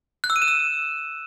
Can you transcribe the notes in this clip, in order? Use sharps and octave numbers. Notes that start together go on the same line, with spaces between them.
F#6
E6
D#7
E7
E6